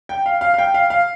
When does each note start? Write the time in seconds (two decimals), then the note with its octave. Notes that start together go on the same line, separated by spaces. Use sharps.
0.09 G5
0.26 F5
0.41 F5
0.54 F5
0.58 G5
0.74 F5
0.90 F5